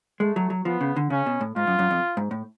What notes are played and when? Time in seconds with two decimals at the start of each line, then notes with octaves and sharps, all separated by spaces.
0.20 G#3 A3
0.36 F#3
0.50 F#3
0.65 F3 B3
0.81 C#3
0.96 D3
1.10 C#3 C#4
1.26 B2
1.41 A2
1.56 G#2 F4
1.67 F#2
1.79 F#2
1.91 F2
2.17 G#2
2.31 A2